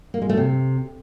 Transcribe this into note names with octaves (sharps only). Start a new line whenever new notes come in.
A#3
G#3
A3
C3